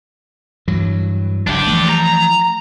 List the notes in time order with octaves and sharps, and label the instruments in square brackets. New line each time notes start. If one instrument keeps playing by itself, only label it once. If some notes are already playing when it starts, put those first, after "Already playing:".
[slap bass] G2 E3 F#3
[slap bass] F#1 [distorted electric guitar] D4 G4
[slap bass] E3 F3 A3
[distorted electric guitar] A#5